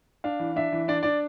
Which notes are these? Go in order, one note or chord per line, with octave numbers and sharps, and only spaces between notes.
D4 F5
E3
D4 E5
E3
D4 D5
D4 D5